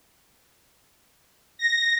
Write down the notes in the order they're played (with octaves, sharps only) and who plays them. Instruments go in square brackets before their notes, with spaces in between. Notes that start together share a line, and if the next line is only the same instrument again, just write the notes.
[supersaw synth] A#6